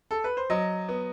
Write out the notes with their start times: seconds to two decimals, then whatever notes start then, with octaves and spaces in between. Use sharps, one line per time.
0.11 A4
0.24 B4
0.37 C5
0.50 F#3 D#5
0.88 B3